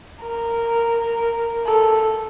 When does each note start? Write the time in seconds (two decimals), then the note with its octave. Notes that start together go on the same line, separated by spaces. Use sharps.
0.21 A#4
1.66 A4